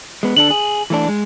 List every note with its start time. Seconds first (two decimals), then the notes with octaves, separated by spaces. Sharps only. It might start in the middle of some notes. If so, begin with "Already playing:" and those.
0.23 G#3 B3
0.37 D3 D4 A4 F#7
0.51 G#4
0.90 E3 A3 D4
1.08 G#3